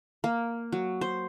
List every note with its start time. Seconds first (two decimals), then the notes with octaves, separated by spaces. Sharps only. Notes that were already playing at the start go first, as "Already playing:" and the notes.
0.24 A#3
0.72 F#3
1.01 C5